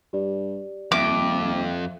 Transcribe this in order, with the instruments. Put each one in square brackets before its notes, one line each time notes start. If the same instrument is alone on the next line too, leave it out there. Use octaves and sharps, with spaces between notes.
[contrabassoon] G2 [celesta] G4 D5
[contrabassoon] D#1 [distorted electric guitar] F2 [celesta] E5 [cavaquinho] D6